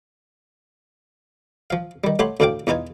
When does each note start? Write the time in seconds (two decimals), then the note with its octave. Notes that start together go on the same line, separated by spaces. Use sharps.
1.70 F3 F5
2.04 D#3 G3
2.19 A3 G4 C#5 F#5 B5 C6
2.40 D2 A2 D4 F5 G5 D6
2.67 E2 E3 D#4 F4 G#5